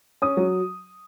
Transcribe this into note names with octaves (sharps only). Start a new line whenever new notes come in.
C#4 D#6
F#3